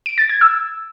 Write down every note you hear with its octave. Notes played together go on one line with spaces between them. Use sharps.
D7
A6
G#6
E6